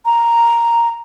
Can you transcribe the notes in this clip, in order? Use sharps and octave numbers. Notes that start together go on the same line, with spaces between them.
A#5